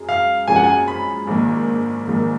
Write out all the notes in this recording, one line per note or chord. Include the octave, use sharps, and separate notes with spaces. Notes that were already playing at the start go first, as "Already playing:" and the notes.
Already playing: F#2 G#3 G#4
F5
F#2 F3 G#3 C#4 G#4 G#5
F#5
G#5
B5
A#1 G#2 D#3 A#3
A#1 G#2 D#3 A#3